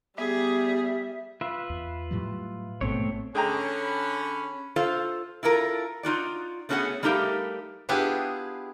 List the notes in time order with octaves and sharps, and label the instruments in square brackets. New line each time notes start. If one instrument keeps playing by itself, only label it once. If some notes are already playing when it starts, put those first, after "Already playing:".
[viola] G3 [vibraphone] B3 [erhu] G#4 [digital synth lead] E5
[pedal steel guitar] F4 B4 E5
[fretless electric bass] E2
A2 F#3 G3
[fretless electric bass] A1 G#2 B2 [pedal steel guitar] A3 C4 C#5
[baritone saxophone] D3 [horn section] C#4 [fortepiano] G#4 G5 A#5 [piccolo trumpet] B5
[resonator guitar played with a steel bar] F4 A4 C5 F5
E4 F4 A4 A#4
D#4 F4 F#4 D5
A3 B3 C#4 F#4 G#4 F#5
G3 A3 D#4 G4 A#4 F5
[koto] B3 D4 E4 F4 G4 G#4